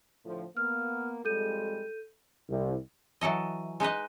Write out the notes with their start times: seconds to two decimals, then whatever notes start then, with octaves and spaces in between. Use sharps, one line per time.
0.25 A2 D3 F3
0.57 A#3 B3 F6
1.25 F2 G3 G#3 A4 G6 D#7
2.49 C2
3.21 E3 F#3 A4 D#5
3.80 G#3 D#4 B4 D#5